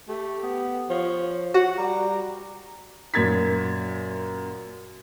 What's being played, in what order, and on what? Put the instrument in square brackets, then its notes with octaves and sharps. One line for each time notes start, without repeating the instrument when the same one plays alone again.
[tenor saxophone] A3 [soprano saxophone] G4
[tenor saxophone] B3
[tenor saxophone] F3 [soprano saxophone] C#5
[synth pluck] F#4 [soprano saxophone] F#5
[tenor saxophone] G3 [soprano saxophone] A#5
[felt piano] F#2 A#2 A#4 G#6 A6 B6